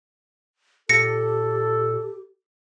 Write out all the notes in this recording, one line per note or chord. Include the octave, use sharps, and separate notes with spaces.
A#2 G4 A4 A#6 C#7